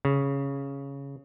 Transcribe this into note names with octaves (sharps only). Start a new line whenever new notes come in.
C#3